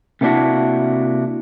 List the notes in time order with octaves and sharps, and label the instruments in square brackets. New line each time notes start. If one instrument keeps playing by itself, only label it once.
[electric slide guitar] C3 A3 A#3 D4 E4 F#4